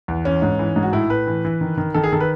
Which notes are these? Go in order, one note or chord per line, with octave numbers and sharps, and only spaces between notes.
E2
E3 C#4
G#2
E3
G#2
F#4
A2 E4
A2 B4
E3
E3
D#3
D#3
D#3 A4
G#4
D#3 A4
B4